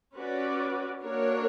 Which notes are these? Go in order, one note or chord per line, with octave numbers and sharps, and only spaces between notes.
C#4 F#4 B4 D5
A#3 D4 F#4 A#4 C#5